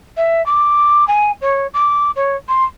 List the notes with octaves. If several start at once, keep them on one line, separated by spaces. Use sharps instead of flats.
E5
D6
G#5
C#5
D6
C#5
C6